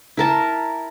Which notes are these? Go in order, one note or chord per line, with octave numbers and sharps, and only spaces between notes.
E4 A#4 A5